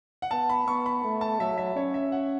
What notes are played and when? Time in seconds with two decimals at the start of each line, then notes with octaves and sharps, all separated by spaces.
0.22 F#5
0.31 B3 A5
0.49 B5
0.67 B3 C#6
0.86 B5
1.04 A3
1.21 A5
1.40 F#3 E5
1.58 E5
1.76 C#4 C#5
1.94 E5
2.12 F#5